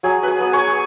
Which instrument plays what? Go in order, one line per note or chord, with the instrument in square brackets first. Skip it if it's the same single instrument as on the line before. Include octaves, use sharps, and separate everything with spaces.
[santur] F#3 G#4
G#4 B4
B3
G#4 C#5